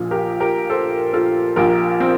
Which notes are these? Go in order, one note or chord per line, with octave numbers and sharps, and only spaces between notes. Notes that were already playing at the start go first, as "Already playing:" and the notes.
Already playing: A#1 A#2 F3
G4 A#4
G4 A#4
A4 C5
F4 A4
A#1 A#2 F3 G4 A#4
C4